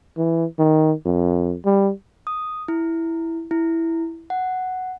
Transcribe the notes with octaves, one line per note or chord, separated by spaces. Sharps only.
E3
D#3
F2
G3
D#6
E4
E4
F#5